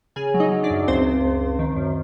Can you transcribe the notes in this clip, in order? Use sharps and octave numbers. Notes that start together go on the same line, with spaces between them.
C#3 G#4 G#5
F#3
D#4 D#5
F#3
D4 D5
F#2
C#2 C4 C5
C#2
C#2
C#2
D#3
F#2